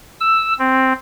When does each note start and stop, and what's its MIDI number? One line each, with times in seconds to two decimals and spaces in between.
0.20 0.53 88
0.59 0.93 60